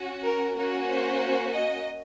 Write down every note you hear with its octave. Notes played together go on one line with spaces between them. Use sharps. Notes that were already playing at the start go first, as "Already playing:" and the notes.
Already playing: C#4 F#4
A#4
A#3 C#4 F#4 A#4
C5
D#5